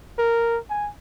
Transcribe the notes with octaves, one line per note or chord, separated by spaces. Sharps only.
A#4
G#5